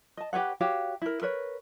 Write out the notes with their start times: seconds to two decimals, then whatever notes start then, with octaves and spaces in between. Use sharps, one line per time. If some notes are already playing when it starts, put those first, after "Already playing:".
0.17 D#5 A5
0.33 G4 B4 C#5 F#5
0.61 F#4 G4 C#5 F5
1.02 E4 A#4
1.22 A#4 B4 C#5